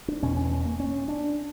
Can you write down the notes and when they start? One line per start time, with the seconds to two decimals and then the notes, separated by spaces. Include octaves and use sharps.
0.08 D4
0.23 E2 B2 C#4
0.37 C#4
0.51 C#4
0.65 A#3
0.80 C#4
1.08 D4